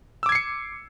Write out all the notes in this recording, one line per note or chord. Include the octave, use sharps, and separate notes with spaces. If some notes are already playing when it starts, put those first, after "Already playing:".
D6 E6 G#6 C7 C#7